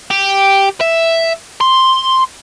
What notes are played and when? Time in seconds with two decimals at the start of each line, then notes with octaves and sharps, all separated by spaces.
0.11 G4
0.81 E5
1.61 C6